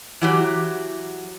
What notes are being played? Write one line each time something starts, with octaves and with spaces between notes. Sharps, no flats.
E3 F#3 G4